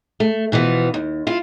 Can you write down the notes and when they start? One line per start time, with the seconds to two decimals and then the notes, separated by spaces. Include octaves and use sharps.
0.20 A3
0.52 B2 E3 F3 B3
0.94 D#2
1.27 E4 F4